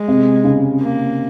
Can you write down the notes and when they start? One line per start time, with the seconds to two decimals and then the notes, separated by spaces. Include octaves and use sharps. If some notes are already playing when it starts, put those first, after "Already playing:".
Already playing: G#3
0.08 C3
0.44 C#3
0.81 A#3